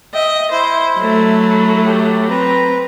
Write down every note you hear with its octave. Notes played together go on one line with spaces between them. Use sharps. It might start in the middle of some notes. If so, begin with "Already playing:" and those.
D#5 E5 G5
E4 C5
F#3 A3
G4
C4 B4 A#5